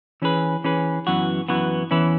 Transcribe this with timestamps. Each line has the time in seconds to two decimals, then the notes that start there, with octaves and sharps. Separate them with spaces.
0.22 E3 C#4 G#4 B4
0.64 E3 C#4 G#4 B4
1.07 F#2 E3 B3 F#4
1.49 F#2 E3 B3 F#4
1.91 E2 E3 C#4 E4 B4